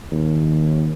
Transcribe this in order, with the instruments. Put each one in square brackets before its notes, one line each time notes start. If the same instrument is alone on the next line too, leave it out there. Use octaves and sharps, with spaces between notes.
[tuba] D#2